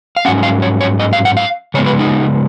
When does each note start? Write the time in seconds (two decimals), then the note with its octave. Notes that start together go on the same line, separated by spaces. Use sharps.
0.17 F5
0.25 G#2 F#3 C#4 F#5
0.43 F5
0.62 C#5
0.81 C#5
1.00 D#5
1.13 F5
1.25 F#5
1.37 F5
1.74 C#3 G#3 B3 C#5
1.86 B4
1.99 D#4